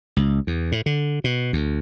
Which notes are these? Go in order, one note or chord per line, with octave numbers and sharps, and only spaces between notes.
C#2
E2
A2
D3
B2
D2